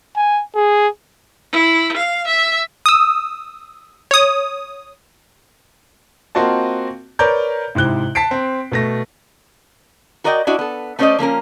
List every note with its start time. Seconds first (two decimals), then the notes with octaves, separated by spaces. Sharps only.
0.16 G#5
0.55 G#4
1.52 E4
1.97 F5
2.27 E5
2.86 D#6 E6
4.11 C#5 D#6
6.35 A#3 C4 F4 F#4 D#5 A5
7.19 A#4 B4 C#5 D5 A#5 G6
7.75 G#2 C3 E4 F#6 G7
8.15 A5 B6 C7 D7
8.31 C4
8.71 B2 A3 A#6
10.24 F#4 A#4 D5 D#5 F5 G5
10.47 D4 E4 F#4 D#5
10.59 B3 A4
10.99 A3 B3 C#4 C5 D5 D#5
11.19 F3 A#3 C#4 A#4